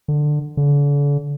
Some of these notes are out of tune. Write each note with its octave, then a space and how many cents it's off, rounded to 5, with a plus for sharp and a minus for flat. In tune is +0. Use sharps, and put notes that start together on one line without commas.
D3 +15
D3 -40